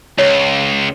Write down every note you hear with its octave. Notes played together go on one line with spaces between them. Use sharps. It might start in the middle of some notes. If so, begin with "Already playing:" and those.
C#2 C#5